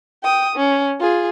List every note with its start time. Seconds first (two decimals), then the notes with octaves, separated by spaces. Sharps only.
0.23 G5 D#6
0.56 C#4
1.00 F4 G#4